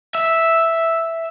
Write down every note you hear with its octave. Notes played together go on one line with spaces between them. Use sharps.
E5